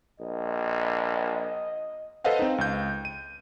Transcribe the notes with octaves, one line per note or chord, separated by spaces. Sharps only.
A#1 D#5
A4 B4 C5 D#5 F5 F#5
C4 D#4
C#2 G6
D#7